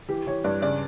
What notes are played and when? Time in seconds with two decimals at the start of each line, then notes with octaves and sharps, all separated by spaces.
0.09 E3 G4
0.27 E3 C#5
0.44 G2 D5
0.62 C#3 D5